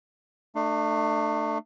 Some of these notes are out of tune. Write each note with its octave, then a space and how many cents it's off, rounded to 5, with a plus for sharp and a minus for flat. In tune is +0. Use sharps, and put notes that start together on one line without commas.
A3 +10 D4 +40